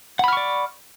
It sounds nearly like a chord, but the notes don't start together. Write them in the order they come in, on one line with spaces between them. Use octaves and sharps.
F#5 B5 F6 C#6 D5